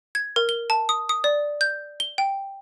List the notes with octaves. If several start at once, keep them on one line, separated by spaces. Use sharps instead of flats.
G#6
A#4
G7
A5
D#6
D#6
D5
G6
G7
G5